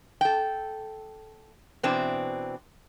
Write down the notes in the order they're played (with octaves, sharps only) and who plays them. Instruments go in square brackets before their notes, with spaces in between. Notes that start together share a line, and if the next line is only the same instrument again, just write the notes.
[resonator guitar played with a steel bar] A4 G5
B2 E3 C4 D4